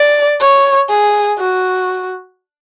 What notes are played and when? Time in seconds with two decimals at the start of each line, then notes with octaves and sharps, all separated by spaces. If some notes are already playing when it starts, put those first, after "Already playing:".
Already playing: D5
0.40 C#5
0.89 G#4
1.38 F#4